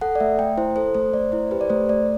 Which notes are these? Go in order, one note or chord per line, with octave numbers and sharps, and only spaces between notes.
A4 F#5
D5
A3 E5
A3 G5
E4 C5
A4 C5
A3 C5
A3 D5
E4 C5
G4 B4
D5
A3 C5
A3 D5